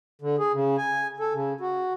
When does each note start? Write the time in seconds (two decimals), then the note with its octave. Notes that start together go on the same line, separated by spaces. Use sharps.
0.22 D3
0.39 G#4
0.53 C#3
0.78 G#5
1.20 A4
1.34 C#3
1.61 F#4